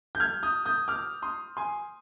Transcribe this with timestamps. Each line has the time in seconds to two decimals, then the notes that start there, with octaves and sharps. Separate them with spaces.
0.15 G6
0.20 F6 G#6
0.43 D#6 G6
0.65 D#6 G6
0.88 D6 F6
1.22 C6 D#6
1.57 G#5 C6